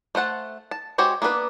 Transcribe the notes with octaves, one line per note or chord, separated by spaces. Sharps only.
A3 C5 F#5 A5
A5
G#3 F#4 G4 C5 C#5
A#3 B3 D4 A#4 B4